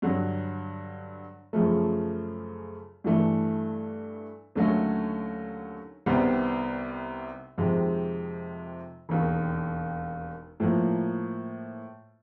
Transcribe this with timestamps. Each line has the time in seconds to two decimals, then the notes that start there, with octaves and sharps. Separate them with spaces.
0.02 G2 D3 F#3
1.53 F#2 C#3 F3 A3
3.04 G2 E3 A3
4.55 D#2 D3 F#3 A3 C#4
6.06 C2 C3 D#3 G3 B3
7.58 F2 C3 D#3 G#3
9.09 E1 D#2 D#3
10.60 A2 F3 A#3